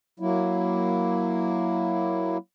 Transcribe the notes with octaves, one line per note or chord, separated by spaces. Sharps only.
F#3 A#3 E4